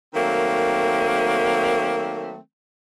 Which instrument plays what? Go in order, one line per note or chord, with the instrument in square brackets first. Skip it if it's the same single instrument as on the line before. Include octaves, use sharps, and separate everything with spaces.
[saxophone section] D#3 F#3 A3 A#3 C4